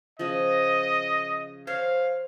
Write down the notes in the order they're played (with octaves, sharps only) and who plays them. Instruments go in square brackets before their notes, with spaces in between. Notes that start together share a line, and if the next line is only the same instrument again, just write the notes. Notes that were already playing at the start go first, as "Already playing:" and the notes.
[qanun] C#3 F3 [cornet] D#5
[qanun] C5 C#5 A#5 [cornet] F5